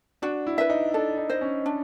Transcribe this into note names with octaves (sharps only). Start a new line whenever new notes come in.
D4 F#4
E4
B4 E5
D#4
D4 A4
D#4
C5 D#5
C#4
D4